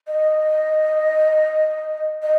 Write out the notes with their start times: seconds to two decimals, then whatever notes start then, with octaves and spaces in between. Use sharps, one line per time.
0.08 D#5
2.23 D#5